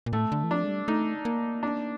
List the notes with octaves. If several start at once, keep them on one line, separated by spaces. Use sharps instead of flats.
A#2
A2 A3
D3
E3
F3 D4
G#3
G3
A3 D#4
A#3
D4